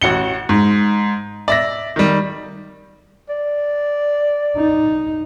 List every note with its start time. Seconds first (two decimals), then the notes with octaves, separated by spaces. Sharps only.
0.02 A1 F#4 C#7 G7
0.49 G#2
1.48 D5 E5 A#6
1.96 D#3 G3
3.29 D5
4.57 D#4